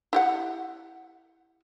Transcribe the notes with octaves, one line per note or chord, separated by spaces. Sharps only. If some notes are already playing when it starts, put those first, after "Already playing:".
E4 G4 F#5